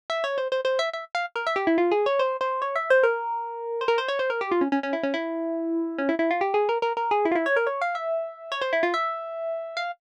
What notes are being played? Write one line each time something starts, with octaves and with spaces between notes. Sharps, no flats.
E5
C#5
C5
C5
C5
E5
E5
F5
A#4
E5
G4
E4
F4
G#4
C#5
C5
C5
C#5
E5
C5
A#4
C5
A#4
C5
C#5
C5
A#4
G4
F4
C#4
C#4
C#4
E4
C#4
E4
C#4
E4
E4
F4
G4
G#4
A#4
A#4
A#4
G#4
E4
F4
E4
C#5
A#4
C#5
F5
E5
C#5
C5
E4
F4
E5
F5